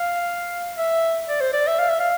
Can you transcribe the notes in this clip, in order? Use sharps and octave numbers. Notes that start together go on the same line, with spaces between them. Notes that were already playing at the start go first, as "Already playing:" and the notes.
Already playing: F5
E5
D5
C5
D5
E5
F5
E5
F5